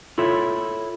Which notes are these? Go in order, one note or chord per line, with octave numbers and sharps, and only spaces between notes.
E4 F4 A4 C#5 E5